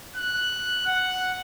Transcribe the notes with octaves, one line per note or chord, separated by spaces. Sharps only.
F#6
F#5